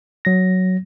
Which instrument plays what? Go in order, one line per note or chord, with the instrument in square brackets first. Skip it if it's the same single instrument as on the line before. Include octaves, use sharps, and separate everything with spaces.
[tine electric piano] F#3 A#6